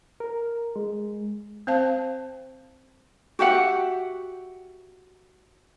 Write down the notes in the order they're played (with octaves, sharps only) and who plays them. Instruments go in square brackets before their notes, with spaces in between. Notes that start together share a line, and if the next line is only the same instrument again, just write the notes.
[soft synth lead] A#4
G#3
[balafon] C4 C5 F5 A5
[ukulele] F#4 G4 E5 F#5